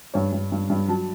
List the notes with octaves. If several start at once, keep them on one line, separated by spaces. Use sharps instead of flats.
G2 C#5
G2
G2
G2
F#3 A5